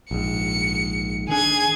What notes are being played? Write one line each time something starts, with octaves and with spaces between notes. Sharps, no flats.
A#1 G#2 C#7
D#3 D4 G#4 G#6